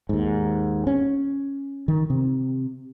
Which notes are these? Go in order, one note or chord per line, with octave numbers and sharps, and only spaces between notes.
D#2 G#2
C#4
D#3
C3